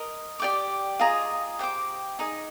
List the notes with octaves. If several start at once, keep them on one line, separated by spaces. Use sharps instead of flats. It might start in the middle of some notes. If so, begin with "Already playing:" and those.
Already playing: A#4 D#5 D#6
G4 D5 G5 D6
F4 G#4 D#5 A#5
G4 C5 G5 D6
D#4 G#4 D#5